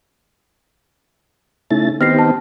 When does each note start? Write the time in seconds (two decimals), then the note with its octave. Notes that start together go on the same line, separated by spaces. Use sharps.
1.71 C#3 A3 D#4 E4 A6
2.01 D#3 B3 C4 D#4 G4 F6 A#6 C7
2.19 A5